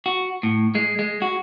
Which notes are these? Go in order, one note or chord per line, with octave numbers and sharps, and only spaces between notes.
F#4
A2
G#3
G#3
F#4